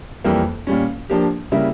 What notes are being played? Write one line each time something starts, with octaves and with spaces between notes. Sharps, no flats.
F2 E3 G3 A#3
A#2 G3 C#4
F3 A#3 D4 G4
C#3 G3 A#3 E4